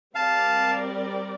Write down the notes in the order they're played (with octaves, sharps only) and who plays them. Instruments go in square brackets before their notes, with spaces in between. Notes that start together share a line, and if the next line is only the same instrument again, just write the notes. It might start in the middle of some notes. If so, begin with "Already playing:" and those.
[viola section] G3 C4 G4 A#4 D5 [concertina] F5 A5